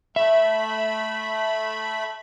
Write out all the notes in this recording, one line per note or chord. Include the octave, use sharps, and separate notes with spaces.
A3 E5 B5